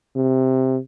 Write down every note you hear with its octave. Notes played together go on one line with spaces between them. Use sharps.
C3